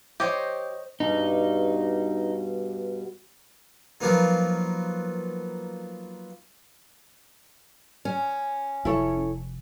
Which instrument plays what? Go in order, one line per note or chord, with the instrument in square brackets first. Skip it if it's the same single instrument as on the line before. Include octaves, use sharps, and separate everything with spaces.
[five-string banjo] G4 [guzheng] C5 C#5 D#5
[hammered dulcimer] G2 B2 [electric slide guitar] D#4
[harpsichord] F3 F#3 A#3 B3 D#4
[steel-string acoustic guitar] C#4
[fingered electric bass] F1 [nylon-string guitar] E4 A4 C#5